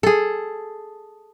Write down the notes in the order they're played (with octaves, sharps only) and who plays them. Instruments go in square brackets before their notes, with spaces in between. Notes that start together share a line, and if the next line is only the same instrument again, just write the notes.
[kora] G#4 A4